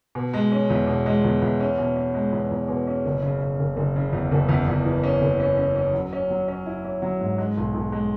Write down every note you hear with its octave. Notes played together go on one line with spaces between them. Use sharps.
B2
G#3
C#4
E2
B2
G#3
E2
E2
C#4
B2
C#4
G#3
E2
E2
B2
C#4
F#1
C#3
C#3
F#1
F#1
C#3
E2
F#1
E2
E2
E3
C#4
F#1
C#4
C#4
C#4
F#3
C#4
F#3
C#4
E4
C#4
F#3
G#2
G#3
B1
B1
G#3